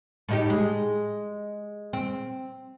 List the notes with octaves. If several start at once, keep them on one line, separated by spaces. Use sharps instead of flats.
A2 D#4 G4
G#3
C4